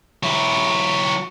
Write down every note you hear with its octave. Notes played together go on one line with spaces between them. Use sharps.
F#3 E4